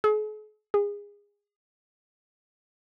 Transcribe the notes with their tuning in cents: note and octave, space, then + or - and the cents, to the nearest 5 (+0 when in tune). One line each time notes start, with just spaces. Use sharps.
G#4 +45
G#4 -25